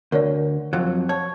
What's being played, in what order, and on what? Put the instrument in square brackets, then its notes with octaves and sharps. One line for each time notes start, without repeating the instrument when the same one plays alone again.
[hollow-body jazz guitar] D2 [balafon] A#4 C#5 D5
[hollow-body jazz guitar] F2 F#3 [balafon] F3
[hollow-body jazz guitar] C#5 [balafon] A5